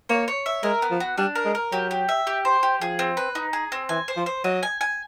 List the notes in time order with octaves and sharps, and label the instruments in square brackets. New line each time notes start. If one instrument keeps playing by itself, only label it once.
[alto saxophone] A#3 [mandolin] C#5
[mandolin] C#5
E5
[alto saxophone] G#3 [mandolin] A#4
[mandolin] B3
[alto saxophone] F3
[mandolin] F#4
[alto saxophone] G3 [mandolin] D4
[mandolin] A#4
[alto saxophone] G#3
[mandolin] A#4
[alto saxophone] F#3 [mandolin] G4
[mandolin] G4
E5
G4
C5
G4
[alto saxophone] F3 [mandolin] G#4
[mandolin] C4
B4
D#4
G#4
C4
[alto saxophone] E3 [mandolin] G#5
[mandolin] C5
[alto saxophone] F3
[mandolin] C5
[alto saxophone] F#3 [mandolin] D#5
[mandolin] G#5
G#5